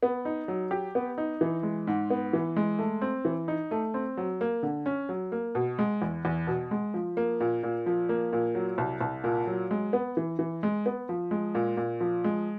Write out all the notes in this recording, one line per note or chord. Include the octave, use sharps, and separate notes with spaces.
B3
D#4
F#3
G4
B3
D#4
E3
G#3
G#2
B3
E3
G#3
A3
C4
E3
D#4
A3
C4
F#3
A#3
D3
C#4
F#3
A#3
B2
G#3
E2
E2
B2
G#3
F3
A#3
A#2
A#2
F3
A#3
A#2
F#3
C2
C2
A#2
F#3
G#3
B3
E3
E3
G#3
B3
F3
G#3
A#2
A#2
F3
G#3